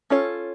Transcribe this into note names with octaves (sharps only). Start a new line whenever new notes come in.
C#4 F4 A4 C#5